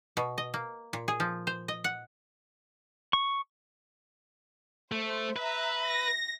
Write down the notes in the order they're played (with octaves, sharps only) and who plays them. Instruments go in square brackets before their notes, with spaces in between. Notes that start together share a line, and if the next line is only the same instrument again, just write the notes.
[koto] B2
D#5
A#3
A#2
G#4
F3
C5
D#5
F#5
[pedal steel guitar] C#6
[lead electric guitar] A3 [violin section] C5
[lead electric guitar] B4 [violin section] E5 A#5
[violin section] A#6